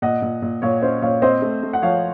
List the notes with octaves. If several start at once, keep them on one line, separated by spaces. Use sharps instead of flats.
A#2 D#5 F#5
A#2
A#2
A#2 C#5 F5
C#4 C5 D#5
A#2 C#5 F5
C4 C5 D#5
A3
A3
F#5
F3 C#5 F5